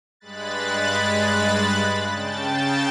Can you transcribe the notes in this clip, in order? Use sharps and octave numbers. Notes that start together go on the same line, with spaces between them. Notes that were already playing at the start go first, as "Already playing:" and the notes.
G2 G#3 B5 F#6 A6
C#3 G5 A5 A6